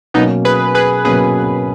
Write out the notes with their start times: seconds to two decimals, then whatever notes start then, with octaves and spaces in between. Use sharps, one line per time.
0.14 B2 F#3 A#3 B3 C#4 D#4
0.45 G#4 B4
0.75 G#4 B4
1.05 B2 F#3 A#3 C#4 G#4 B4